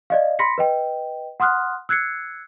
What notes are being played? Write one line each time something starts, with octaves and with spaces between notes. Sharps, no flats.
D5 D#5 F5
B5 C6 A#6 B6 C#7
B4 D#5 G5
F#5 C6 D#6 F6 F#6
E6 F#6 G#6 C7 C#7